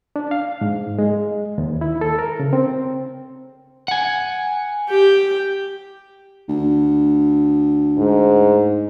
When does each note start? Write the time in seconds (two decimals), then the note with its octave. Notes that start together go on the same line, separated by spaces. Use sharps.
0.16 D4
0.31 F5
0.61 G#2
0.99 G#3
1.58 D#2
1.81 E4
2.01 A4
2.19 A#4
2.40 C#3
2.53 C4
3.88 F#5 G#5
4.89 G4 G5
6.49 D2
7.98 G#2